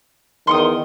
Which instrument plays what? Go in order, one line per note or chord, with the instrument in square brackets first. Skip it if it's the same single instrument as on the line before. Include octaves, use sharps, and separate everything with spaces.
[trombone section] E2 D#3 [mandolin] C6 C#6 D#6